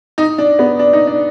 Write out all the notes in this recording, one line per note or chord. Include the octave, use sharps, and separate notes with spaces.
D#4
D4
B3
D4
D#4
D4